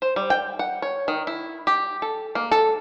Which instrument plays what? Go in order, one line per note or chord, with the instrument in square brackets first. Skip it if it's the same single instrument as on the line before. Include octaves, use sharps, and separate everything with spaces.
[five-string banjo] C5
G3
G5
F#5
C#5
D#3
E4
G4
A4
A#3
A4